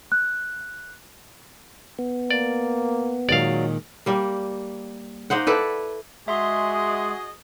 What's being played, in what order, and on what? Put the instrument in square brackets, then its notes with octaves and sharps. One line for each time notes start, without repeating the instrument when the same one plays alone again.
[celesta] F#6
[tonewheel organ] B3
[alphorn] A#3 [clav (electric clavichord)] D5
[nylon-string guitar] A#2 D#3 G#3 [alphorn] F#3 [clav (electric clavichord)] D5 F5
[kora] G3 A#3
A#3 D#4 C5 F#5
E4 A4 B4 D5
[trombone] G#3 [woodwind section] F#4 G#4 [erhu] D#5 [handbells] E5 C6